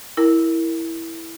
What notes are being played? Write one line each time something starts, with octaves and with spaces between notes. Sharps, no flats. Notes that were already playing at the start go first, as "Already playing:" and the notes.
E4 A#4